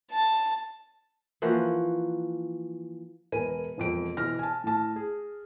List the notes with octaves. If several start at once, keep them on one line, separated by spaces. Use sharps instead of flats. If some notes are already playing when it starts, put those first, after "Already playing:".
A5
E3 F3 A#3 F#4
E1 A#4 B4 G#5 D#7
E1 F2 D7
B2 E3 F6 A#6
G#5 A5
A2 A5
G#4